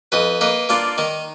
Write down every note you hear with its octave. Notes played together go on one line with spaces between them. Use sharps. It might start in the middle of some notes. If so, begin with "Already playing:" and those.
F2 B4 D#5
A#3 B4 D#5
A#3 D4 F4
D#3 D#4